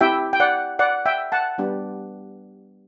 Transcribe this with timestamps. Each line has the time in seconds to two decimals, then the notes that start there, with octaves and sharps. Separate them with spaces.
0.01 C4 E4 G4 E5 G5
0.33 G5
0.40 D5 F#5
0.79 D5 F#5
1.06 E5 G5
1.32 F#5 A5
1.58 G3 B3 D4 G4